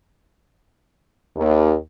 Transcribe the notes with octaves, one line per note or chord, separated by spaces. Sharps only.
D#2